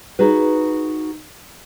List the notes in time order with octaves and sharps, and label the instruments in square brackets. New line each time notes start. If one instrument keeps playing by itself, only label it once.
[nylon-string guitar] D#4 F#4 G#4 B4